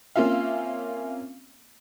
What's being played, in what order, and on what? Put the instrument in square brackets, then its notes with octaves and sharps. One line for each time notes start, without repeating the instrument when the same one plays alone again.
[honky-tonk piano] A#3 C4 C#4 F4 E5 F5